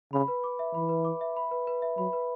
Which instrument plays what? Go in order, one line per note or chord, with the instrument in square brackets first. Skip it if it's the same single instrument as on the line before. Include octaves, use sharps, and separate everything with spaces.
[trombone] C#3 [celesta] B5
[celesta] B4
D6
E5
[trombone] E3 [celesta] B5
[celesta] B4
D6
E5
B5
B4
B4
E5
[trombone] F#3 [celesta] B5
[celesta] B4